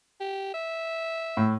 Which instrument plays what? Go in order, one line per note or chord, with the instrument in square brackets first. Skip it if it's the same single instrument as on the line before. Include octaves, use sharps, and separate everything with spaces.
[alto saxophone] G4
E5
[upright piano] A2